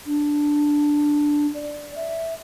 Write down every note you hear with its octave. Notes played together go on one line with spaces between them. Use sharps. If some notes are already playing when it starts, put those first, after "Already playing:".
D4
D5
E5